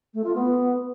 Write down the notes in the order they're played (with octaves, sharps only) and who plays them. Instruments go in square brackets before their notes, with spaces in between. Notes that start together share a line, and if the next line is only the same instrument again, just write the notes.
[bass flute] A3
F4
B3